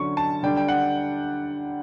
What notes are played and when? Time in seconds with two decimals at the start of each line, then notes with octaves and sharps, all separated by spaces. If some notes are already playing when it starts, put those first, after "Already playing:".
Already playing: D3 F#3 C#4 C#6
0.17 A5
0.43 D3 G3 D4 G5
0.57 G5
0.68 F#5